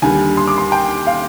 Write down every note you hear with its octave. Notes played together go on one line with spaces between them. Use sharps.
D#2 D3 G3 G#5
C6
D6
C6
G5
F5